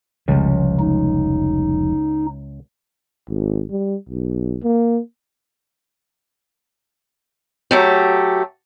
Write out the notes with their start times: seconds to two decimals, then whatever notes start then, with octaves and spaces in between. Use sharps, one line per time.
0.28 F1 C#2 F3 G3
0.79 D#4
3.29 G#1
3.71 G3
4.09 B1
4.63 A#3
7.71 F#3 A3 G4